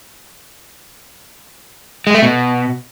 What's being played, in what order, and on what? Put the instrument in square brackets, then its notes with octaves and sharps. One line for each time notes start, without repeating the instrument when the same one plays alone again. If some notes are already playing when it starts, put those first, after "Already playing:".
[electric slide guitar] G#3
A3
B2